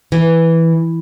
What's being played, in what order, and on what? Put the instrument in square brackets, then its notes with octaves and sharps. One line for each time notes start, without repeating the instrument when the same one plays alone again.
[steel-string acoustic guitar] E3